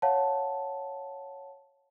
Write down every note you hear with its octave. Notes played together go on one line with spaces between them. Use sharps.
C#5 F5 F#5 A5